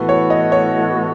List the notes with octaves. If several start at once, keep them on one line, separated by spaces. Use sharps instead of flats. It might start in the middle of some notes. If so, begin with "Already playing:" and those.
Already playing: A2 E3 B3 F#4 A4 B4
C#5
D#5
C#5